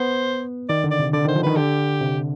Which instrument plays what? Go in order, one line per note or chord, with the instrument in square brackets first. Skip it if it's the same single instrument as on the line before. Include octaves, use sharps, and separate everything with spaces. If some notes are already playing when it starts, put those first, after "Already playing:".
Already playing: [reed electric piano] B3 [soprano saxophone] C5
[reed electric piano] D#3 [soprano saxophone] D5
[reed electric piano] D3
[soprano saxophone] D5
[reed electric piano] C3
[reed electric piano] D3 [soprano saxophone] D5
[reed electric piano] D#3 [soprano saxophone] C5
[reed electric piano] F3
[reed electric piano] D#3 [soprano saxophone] B4
[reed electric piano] D3 [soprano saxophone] G4
[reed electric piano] C3